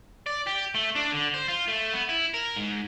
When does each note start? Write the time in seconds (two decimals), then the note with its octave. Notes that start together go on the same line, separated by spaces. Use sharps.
0.27 D5
0.47 G4
0.75 A3
0.95 D4
1.11 D3
1.34 C5
1.48 F4
1.68 A3
1.93 B3
2.09 E4
2.34 A#4
2.56 G#2